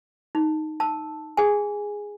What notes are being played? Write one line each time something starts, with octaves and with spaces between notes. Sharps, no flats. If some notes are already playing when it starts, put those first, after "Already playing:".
D#4
A5 E6
G#4 G#5